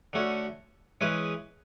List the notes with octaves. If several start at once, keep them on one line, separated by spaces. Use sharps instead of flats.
D3 A3 C#4 F#4
E3 G#3 C#4 G#4 B4